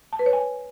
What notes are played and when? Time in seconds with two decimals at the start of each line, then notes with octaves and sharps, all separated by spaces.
0.13 A5
0.19 B4
0.26 C#5
0.33 G#5